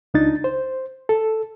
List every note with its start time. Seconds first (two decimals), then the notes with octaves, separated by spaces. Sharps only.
0.14 C#2 D4 D#4 A6
0.44 C5
1.09 A4